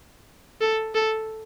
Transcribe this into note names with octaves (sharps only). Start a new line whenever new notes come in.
A4
A4